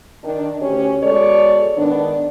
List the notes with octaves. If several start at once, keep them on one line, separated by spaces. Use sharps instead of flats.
D#3 D4
D2 C#4 G4 C#5
B2 G#3 A4 C#5 D5
G#2 D#3 B3 D4